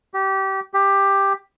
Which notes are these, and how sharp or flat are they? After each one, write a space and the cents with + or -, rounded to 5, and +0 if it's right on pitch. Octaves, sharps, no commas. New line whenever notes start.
G4 -25
G4 +10